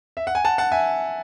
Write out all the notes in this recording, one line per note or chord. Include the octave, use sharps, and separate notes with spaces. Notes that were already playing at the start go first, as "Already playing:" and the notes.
E5
F#5
G#5
F#5 A5
F#5 A5
E5 G#5